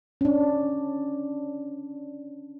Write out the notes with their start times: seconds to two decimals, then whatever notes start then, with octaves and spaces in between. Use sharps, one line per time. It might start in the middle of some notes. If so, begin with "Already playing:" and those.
0.21 C#4 D4